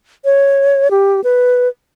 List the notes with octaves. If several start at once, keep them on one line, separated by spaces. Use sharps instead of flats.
C#5
G4
B4